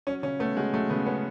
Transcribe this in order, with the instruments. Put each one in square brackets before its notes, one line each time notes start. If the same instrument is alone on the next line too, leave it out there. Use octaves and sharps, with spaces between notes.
[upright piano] F#3 [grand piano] C#4
[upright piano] C#3 [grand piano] C#4
[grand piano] A3 [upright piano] B3
[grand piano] G#3 [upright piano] F#4
[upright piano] F#3 [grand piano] A3
[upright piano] C#3 [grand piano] B3
[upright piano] B3 [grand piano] C#4